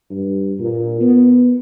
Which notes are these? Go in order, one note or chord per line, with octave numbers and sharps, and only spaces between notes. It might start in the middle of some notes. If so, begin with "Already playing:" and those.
G2
A#2
B3